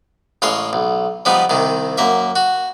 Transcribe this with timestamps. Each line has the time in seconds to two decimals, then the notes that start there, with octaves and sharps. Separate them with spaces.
0.42 A1 G#3 A4 C#5 F5 C6
0.73 B1
1.25 F3 G3 G#3 B3 D#4
1.50 C2 C3 D#3
1.98 F#2 A#3 E5
2.36 F#4